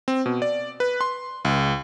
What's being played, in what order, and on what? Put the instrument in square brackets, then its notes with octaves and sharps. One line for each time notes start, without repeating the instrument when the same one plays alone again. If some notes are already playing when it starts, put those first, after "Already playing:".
[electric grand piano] C4
B2
D5
B4
C6
C#2